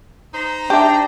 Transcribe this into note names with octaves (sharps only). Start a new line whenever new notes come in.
D#4 C5 A#5
D4 G4 E5 G5